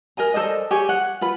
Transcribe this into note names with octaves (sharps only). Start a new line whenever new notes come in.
A#4 D#5 G#5 A#5
A4 C5 D5 D#5
G4 G#4 C#5 G#5
F#5
F4 B4 B5